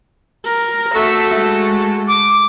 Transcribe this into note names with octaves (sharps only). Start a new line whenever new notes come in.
A#4
A3 F#4 A4 E5
G#3
D6